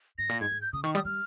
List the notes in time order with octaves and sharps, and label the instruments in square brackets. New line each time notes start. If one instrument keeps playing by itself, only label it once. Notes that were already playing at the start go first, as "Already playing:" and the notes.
[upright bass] G#2 [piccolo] A#6
[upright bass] A#2
[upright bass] G#2 [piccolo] G#6
[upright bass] G#2
[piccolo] G6
[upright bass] C#3 [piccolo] D#6
[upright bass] D#3 [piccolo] C#6
[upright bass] G3 [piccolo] D#6
[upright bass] G3 [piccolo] F6